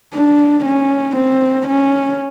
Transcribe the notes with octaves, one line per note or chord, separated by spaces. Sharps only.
D4
C#4
C4
C#4